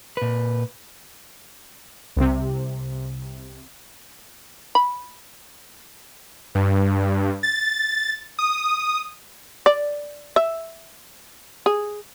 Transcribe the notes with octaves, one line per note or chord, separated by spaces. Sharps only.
A#2 B4
C2 C3
B5
G2
A6
D#6
D5
E5
G#4